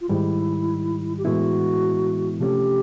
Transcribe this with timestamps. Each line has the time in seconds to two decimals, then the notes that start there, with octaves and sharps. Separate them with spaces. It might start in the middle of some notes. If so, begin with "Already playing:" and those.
0.01 F4
0.09 G#2 D#3 G3 E4
1.18 G4
1.25 A2 E3 G#3 B3 E4 F#4
2.40 C3 F3 A3 C#4 G4